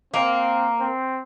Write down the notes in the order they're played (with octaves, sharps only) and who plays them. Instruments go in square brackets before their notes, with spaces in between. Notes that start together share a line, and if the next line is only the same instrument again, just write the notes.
[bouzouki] A#3 [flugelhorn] C4
[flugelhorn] C4